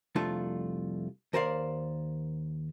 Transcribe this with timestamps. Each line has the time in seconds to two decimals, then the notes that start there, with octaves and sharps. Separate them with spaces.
0.15 C2 F2 A3 D4 F4 A5
1.33 D#2 A#4 C5 D5 F5